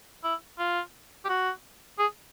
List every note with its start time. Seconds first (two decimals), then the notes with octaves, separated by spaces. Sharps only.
0.24 E4
0.59 F4
1.25 G4
1.29 F#4
1.99 G#4